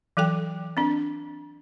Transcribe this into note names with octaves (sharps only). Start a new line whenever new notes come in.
E3 F#3 A4 G5
C4 D4